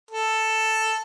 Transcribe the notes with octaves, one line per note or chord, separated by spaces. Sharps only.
A4